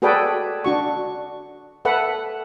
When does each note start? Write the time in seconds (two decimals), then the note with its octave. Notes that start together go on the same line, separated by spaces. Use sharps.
0.02 F#4 G#4 A4 B4 D5 G5
0.64 D4 F#4 C#6
1.85 A4 B4 E5 F#5